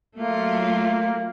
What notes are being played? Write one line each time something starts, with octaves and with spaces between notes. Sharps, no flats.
F#3 A3 A#3 F4